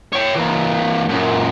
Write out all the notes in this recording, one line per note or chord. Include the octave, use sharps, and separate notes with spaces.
C#5 G5
E3 A#3
F#2 A#2